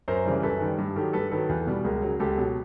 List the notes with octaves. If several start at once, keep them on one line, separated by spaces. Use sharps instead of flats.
F#2 A#4 C5
C#3 E3 G3
F#2 A4 B4
D#3 G3
G2
D#3 F#3 G4 A4
G2 A4 B4
D#3 F#3 A4 B4
E2
B2 G3
C#2 G#4 A#4
C#3 F#3
C#2 G4 A4
B2 F#3